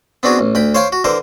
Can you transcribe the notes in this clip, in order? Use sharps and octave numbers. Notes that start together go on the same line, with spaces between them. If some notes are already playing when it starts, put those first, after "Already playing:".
B3 C4 D4 F#4 G#4
A1
D2 G5 B5
C5 C#5 F5 G5 C6
F#4
D3 E3 A#4 C5